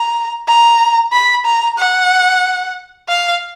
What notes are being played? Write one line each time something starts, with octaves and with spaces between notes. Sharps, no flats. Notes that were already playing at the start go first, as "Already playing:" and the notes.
Already playing: A#5
A#5
B5
A#5
F#5
F5